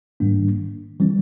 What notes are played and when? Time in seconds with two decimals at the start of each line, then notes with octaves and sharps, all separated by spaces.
0.20 G#2 D#3 G3 A#3 D4
1.00 E3 G3 C4